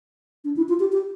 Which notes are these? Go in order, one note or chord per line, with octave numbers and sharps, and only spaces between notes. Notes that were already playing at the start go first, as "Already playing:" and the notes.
D4
E4
F4
G4
G4